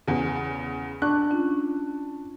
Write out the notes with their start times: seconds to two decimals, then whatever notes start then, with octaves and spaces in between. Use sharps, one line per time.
0.07 E2 C#3
1.02 D4 C#6 D6 F#6
1.31 C#4 D#4 F4